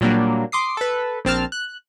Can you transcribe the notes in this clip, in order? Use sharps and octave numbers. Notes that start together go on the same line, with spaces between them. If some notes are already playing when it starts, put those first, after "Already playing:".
A#2 F#3 G3 A#3 D4
C6 D6 D#6 C7
A4 B4
A#1 C4 A5 F6
F#6